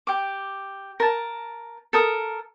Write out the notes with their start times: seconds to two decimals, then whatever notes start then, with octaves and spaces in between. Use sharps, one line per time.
0.07 G4 D6
1.00 A#4 A5
1.93 A4 A#4 D#6